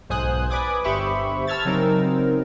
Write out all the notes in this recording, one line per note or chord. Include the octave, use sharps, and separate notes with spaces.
B1 G#2 C5 G#5 D#6 F#6
B4 D5 G#5 D6 D#6 G#6
G1 G4 C5 E5 B5 C#6
A5 E6 F6 G#6 A6
C#3 F#3 C4 D#4 A#4